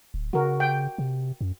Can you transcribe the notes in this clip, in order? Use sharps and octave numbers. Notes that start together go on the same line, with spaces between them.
D1
C#3 F#4 A#4
G5
C3
F#2